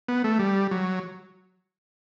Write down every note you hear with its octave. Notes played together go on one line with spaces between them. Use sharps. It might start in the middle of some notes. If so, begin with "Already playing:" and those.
B3
A3
G3
F#3